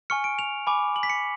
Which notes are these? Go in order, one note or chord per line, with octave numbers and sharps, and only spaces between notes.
G#5 C#6 F6 C#7
D7
F7
G#5 B5 D6
F#7
B6
C#7